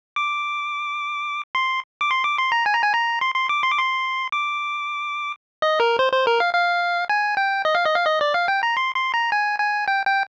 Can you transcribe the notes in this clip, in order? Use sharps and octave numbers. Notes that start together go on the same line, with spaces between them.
D6
C6
D6
C6
D6
C6
A#5
G#5
A#5
G#5
A#5
C6
C6
D6
C6
D6
C6
D6
D#5
A#4
C5
C5
A#4
F5
F5
G#5
G5
D#5
F5
D#5
F5
D#5
D5
F5
G5
A#5
C6
C6
A#5
G#5
G#5
G5
G5